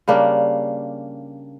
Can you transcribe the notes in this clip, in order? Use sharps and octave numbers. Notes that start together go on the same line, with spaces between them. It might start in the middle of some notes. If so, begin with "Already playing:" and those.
C#3 G3 A#3 D4